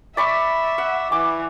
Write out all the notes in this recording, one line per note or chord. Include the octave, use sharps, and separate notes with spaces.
D5 E5 B5 C#6
F#5
E3 D6